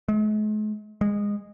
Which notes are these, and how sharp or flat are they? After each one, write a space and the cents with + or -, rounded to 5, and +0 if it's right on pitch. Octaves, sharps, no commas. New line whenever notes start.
G#3 +45
G#3 -20